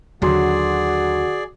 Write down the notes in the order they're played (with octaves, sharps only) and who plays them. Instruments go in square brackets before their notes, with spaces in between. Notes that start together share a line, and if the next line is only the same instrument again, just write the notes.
[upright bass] D#2 D3 [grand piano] F#3 C6 [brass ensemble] F#4 [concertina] G#4 D5